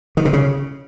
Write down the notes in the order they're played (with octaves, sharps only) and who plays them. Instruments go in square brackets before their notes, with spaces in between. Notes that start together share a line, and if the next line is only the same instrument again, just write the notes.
[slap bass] D#3
C3
C#3